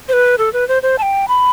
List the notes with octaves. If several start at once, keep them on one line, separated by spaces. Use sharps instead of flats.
C5
B4
A4
B4
C5
C5
A5
G5
B5